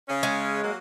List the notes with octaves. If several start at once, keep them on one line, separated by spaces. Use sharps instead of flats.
C#3 C#4
G#3
F#3 A#3